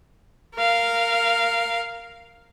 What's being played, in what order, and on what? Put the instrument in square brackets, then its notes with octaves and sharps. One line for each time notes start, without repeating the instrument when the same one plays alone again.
[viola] A#4 F5